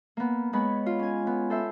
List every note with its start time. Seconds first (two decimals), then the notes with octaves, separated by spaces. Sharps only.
0.17 A#3 B3
0.53 G#3 B3 C#5 B5
0.86 F4
0.99 C#4 G#5
1.27 B3
1.50 A4 C5 E5